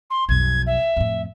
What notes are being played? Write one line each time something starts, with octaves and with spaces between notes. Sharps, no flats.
C6
B1 F2 G#6
E5
F2 A2